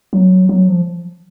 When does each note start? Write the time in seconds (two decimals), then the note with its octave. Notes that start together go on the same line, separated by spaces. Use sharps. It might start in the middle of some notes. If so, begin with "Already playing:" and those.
0.13 F#3
0.49 F#3
0.68 F3